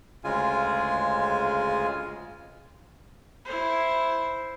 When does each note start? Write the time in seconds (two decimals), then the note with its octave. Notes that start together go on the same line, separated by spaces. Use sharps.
0.24 D2 C#3 G#3 F4 G#5
3.45 E4 C5